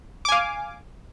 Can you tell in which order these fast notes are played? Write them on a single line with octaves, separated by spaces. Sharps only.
D6 G#5 F5